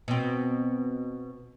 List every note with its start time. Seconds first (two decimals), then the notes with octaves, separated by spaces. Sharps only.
0.08 B2 C4